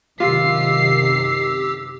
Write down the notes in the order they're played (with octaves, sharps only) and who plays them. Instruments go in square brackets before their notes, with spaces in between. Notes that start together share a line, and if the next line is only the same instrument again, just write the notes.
[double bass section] F#2 C3 D#3 [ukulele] F4 [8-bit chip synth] G4 E6 [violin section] C7